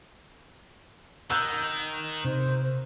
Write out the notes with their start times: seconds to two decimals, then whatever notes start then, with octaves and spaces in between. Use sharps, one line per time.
1.30 D#3 E6 F#6 G6
2.25 C3 C5